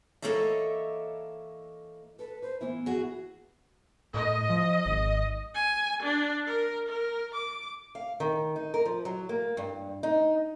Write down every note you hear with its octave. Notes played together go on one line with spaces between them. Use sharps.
E3 A#3 A4 C#5 D#5 E5
A4 B4
B4 C5
E3 A#3 B3 E4
F#4 G#4
A2 D#5
F3
G#1
G#5
D4
A#4
A#4
D6
F5
D#3
D#4
A#4
F3
F#3
A#3
G2
D#4